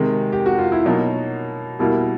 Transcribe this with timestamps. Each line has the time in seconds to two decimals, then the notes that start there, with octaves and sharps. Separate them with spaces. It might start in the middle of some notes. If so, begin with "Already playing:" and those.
Already playing: C3 D#3 G#3
0.32 G4
0.46 F#4
0.58 F4
0.72 E4
0.85 B2 F#3 A#3 D#4
1.79 B2 G3 A#3 E4